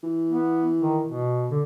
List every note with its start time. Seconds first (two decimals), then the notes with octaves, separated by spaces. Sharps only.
0.03 E3
0.29 B3
0.80 D#3
1.07 B2
1.51 D3